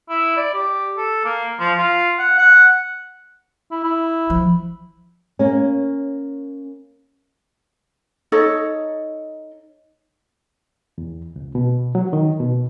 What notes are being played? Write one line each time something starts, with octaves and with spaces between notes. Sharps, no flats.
E4
D5
G4
A4
A#3
F3
F4
F#5
F#5
E4
E4
F3
A#3 C#4
D#4 A4 C#5 D#5
E2
C#2
B2
F#3
D#3
B2